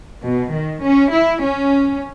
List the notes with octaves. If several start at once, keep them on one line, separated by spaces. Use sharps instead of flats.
B2
D#3
C#4
E4
C#4